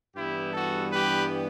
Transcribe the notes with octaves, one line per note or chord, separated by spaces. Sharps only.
G2 E3 G3 B3 E4 G4
F#4 A4
G4 B4